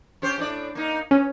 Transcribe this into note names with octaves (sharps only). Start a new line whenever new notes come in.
C#4 G4 C5
A2 D4 D5
A#3 D#4
G2 C#4